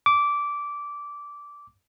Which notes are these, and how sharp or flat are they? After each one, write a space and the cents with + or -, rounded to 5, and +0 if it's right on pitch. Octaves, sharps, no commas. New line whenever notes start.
D6 -15